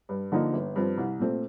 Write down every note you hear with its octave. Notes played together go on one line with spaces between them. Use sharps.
G2
D3 F3 A#3 D#4
G1
G2 F3 C4
C2
A#2 A3 C4